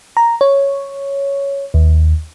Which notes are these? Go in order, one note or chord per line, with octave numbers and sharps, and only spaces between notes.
A#5
C#5
D#2